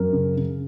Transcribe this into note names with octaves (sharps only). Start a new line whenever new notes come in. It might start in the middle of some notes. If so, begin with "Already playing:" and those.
Already playing: F#2 A#4
C#3
C#3